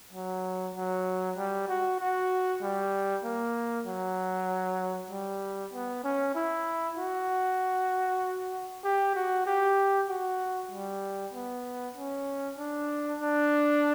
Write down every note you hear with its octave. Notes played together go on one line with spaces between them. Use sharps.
F#3
F#3
G3
F#4
F#4
G3
A#3
F#3
G3
B3
C#4
E4
F#4
G4
F#4
G4
F#4
G3
B3
C#4
D4
D4